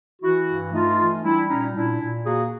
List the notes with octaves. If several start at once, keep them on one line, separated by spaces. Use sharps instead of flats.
E3 E4 F#4
G2
A3 D#4 F4
E3
G3 D4 E4
A#2 C#4 D#4
A#2 D4 E4
A#2
A#3 F#4 G#4